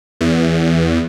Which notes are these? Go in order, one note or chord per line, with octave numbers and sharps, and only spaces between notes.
E2